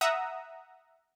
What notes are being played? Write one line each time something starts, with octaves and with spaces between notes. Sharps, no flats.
E5 F#5 A#5 D#6 E6